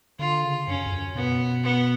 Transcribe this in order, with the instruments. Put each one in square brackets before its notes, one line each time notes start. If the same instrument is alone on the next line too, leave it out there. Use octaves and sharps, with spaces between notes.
[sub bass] D3 [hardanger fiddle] F4
[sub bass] C#3
[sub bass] F#2 [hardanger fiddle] C#4
[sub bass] F2
F#2
[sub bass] B2 [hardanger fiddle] B3
[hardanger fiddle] B3